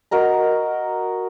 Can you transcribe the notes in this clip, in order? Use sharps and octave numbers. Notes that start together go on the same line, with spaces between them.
F#4 A#4 D#5 A#5